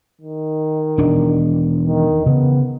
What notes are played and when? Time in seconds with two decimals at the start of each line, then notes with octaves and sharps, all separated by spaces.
0.21 D#3
0.98 E1 D4
1.87 D#3
2.26 C#3 B3